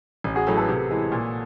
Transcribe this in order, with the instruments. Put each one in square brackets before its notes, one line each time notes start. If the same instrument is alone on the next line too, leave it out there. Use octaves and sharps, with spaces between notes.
[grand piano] A1
[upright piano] F#4 G#4
[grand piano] A2 F#3 A3
[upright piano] A4 B4
[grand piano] C3
E3 G#3
A#2